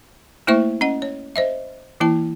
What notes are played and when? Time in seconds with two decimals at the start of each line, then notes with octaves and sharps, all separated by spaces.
0.47 A3 A#3 E4 C5 E5 C#6
0.81 C#4 D#5 F#5
1.02 C#5
1.36 C5 D#5 E5
2.00 E3 A#3 E4 A5